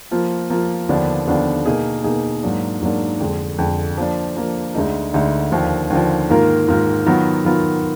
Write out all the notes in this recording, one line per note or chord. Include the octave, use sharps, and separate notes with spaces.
F3 A#3 F4
F3 A#3 F4
D#2 D3 F3 B3 D4
D#2 D3 F3 B3 D4
B2 A#3 D#4 G#4
B2 A#3 D#4 G#4
G#2 F#3 A#3 D4
G#2 F#3 A#3 D4
F2 D3 G#3
F2 D3 G#3
F3 A#3 D4
F3 A#3 D4
D2 D3 G#3 D#4
D2 D3 G#3 D#4
D#2 D3 F3
D#2 D3 F3
G#2 D#3 A#3 F4 A#4
G#2 D#3 A#3 F4 A#4
D#3 F#3 B3 F4 A#4
D#3 F#3 B3 F4 A#4